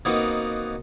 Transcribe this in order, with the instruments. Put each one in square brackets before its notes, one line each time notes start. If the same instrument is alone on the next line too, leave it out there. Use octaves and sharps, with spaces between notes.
[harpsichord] B2 A#3 C4 D#4 F#4 B4